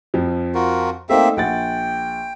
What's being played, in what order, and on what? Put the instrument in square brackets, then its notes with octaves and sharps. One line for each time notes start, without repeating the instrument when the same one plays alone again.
[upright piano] F2 F3
[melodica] F4 F#4 A#4
[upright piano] A3 D#4 [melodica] A#3 C4 E5
[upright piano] A#1 F#5 A6 [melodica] G5